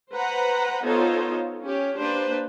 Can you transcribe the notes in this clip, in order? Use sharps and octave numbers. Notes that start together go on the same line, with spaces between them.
B4 C5 F#5 A#5
B3 D#4 F4 A4 C5 C#5
C#4 G4
A#3 D4 G4 B4 C5